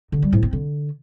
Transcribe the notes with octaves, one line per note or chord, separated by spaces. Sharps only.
D3
G3
A2
C4
D3